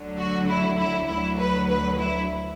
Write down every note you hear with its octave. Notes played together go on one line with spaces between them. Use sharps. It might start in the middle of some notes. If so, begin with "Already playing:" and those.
Already playing: D2 D3 F#3
F#4
E4
E4
D2 D3 F#3 E4
B4
B4
E4